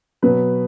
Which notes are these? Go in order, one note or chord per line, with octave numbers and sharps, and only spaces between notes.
B2 F#3 B3 B4